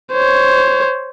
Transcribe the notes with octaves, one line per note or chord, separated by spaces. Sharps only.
C5 C#5